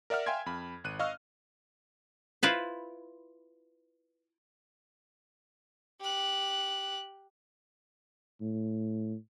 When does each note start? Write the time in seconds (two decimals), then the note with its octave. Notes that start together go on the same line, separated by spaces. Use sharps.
0.10 A#4 D5 E5 F#5 F6
0.26 E5 F5 G5 G#5 C6 G#6
0.46 F2 B5
0.84 G#1 F#6 D#7
0.99 D#5 F5 C#6 E6 F6
2.43 E4 F4 B4 C5
6.01 G4 F#6
8.41 A2